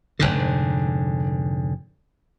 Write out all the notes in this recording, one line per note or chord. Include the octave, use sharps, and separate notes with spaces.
F1 B1 G#2 D3